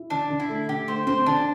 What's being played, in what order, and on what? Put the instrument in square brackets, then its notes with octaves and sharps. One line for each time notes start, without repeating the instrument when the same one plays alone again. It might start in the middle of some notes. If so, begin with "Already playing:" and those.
Already playing: [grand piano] E4
[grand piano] D3 [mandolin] D4
[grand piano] D3
[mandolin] E4
[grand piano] A3
[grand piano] D3 [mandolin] G4
[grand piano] A3 [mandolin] C5
[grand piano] C4 [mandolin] C5
[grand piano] D3 [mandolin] D4